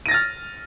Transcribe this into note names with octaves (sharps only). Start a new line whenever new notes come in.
F6 A6 A#6 D#7